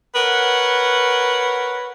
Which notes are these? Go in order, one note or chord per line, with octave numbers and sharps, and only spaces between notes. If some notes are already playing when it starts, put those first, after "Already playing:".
A#4 B4 C#5 F#5